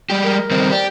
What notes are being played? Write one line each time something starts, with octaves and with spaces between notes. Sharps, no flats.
G3 G#3 G4
A#4
D#3 G3 C4
G4 D5